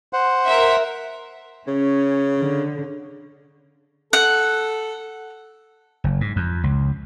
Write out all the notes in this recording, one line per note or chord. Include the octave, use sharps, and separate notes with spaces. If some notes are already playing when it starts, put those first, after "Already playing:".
C5 F#5
A#4 E5
C#3 C#4
D3
A4 F#5
F#1
G#2
F2
C#2